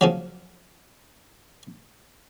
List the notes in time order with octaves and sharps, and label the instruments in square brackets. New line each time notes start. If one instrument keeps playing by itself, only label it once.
[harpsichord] C#3 F3 F#3